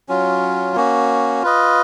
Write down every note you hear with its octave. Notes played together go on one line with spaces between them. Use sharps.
F#3 C#4 F4
A#3 C#4 F#4
F4 B4 D#5